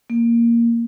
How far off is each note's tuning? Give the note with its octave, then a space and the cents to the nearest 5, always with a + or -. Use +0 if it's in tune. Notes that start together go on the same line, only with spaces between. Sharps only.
A#3 +0